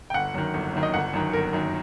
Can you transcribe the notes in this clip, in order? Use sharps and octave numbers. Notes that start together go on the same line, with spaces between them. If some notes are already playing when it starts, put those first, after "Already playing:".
G5
G1 F#5
F#2 D#3
G1
F#2 D#3
D#5
G1 F#5
F#2 D#3
G1 A#4
F#2 D#3